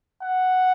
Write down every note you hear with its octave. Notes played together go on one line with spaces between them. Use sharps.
F#5